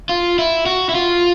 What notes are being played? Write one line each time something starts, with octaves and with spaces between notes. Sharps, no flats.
F4
E4
F#4
E4
F4